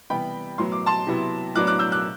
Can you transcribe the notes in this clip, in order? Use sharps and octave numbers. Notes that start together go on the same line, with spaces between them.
C3 E3 G3 B3 G5 B5
A2 F#3 B3 C6
D6
A5 C6
C3 F#3 B3 E4
A2 F#3 B3 D4 D6 F#6
D6 F#6
E6 G6
D6 F#6